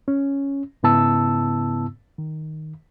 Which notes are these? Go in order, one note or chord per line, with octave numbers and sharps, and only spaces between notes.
C#4
G#2 C#3 B3 E4 A5 E6
D#3